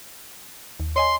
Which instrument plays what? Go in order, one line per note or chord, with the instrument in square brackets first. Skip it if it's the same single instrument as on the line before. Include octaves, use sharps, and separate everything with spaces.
[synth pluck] D#2
[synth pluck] C#5 D#5 G#5 [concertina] C6